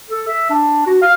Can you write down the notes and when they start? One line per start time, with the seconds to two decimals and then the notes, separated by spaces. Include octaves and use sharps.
0.10 A4
0.28 E5
0.50 D4
0.86 F#4
1.02 F5